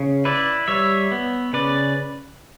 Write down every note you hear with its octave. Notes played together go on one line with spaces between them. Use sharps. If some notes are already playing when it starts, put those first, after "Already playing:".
Already playing: C#3
E4 B4 D5
G3 C#5 E5
B3
C#3 B4 D5